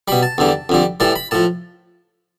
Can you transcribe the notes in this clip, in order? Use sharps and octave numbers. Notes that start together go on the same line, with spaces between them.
B2 G3 B5
A5
E2 D3 G3
F2 D3 G3
A2 E3 G3 A5
B5
A2 F3 A5